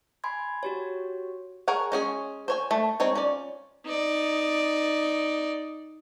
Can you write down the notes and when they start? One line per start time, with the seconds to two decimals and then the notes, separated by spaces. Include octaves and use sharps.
0.24 G#5 B5 C6 G#6
0.63 F#4 G4 C#5
1.68 G#4 A#4 C#5 F#5
1.92 G#3 C#4 G#4
2.48 C5 C#5 G#5
2.71 A3
3.00 G#3 C4 D#4 C#5
3.15 C#4 F4 D5
3.85 D#4 D5